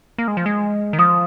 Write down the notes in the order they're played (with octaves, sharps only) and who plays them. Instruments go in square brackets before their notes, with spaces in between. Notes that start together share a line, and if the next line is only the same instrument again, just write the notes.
[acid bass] A#3
G#3
F3
G#3
D#3
[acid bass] F3 [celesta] D#6